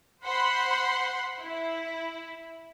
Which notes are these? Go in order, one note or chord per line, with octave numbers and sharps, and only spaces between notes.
C5 F#5 B5 C6
E4